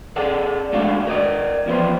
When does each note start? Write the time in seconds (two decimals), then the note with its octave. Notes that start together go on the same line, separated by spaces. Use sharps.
0.16 G#4 A4 D5 F#5
0.73 G#3 A3 D4 F#4 D5 F5
1.07 A#4 D5 D#5
1.66 E2 F3 B3 C5